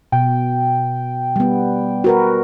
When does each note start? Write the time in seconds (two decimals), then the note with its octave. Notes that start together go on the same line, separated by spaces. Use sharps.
0.12 B2 G5
1.36 G3 B3
2.04 F#4 A#4 B4